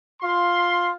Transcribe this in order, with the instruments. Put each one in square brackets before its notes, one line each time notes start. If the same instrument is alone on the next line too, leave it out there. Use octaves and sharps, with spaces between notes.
[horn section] F4 C6